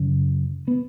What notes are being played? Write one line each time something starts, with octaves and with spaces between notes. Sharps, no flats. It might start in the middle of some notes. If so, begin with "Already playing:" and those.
Already playing: F#2 C#3
B3